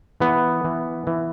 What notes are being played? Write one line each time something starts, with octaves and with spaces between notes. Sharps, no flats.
E3 B3
E3
E3